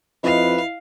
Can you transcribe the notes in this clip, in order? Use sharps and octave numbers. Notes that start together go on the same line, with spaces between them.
F2 E4 B4 D#5 F5